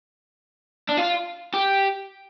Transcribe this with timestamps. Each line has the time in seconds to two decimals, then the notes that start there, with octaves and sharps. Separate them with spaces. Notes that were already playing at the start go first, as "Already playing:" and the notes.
0.89 D4
0.97 F4
1.54 G4